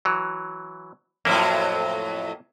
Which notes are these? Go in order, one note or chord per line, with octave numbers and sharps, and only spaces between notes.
E3 F#3
F2 A2 F#3 A#3 E4